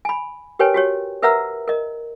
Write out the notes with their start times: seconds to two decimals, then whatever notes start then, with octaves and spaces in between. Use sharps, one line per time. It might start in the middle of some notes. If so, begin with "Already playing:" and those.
0.05 G#5 B5
0.59 G4 A#4 B4 C#5 G5 G#5
0.74 F#4 G4 C#5
1.22 A#4 B4 E5 F#5 A#5 E6
1.68 A#4 D#5